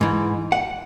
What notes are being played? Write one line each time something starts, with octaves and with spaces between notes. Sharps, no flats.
G#2 E3
F#5